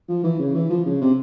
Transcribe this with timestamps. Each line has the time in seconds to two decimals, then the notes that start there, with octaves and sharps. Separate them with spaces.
0.09 F3
0.24 E3
0.39 C#3
0.55 E3
0.70 F3
0.86 C#3
1.01 C3